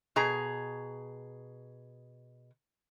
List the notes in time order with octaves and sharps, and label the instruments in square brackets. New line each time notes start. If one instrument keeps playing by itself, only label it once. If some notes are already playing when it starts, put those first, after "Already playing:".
[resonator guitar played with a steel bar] B2 G#4 A#5